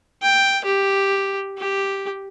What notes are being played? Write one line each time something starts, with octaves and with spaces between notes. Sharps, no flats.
G5
G4
G4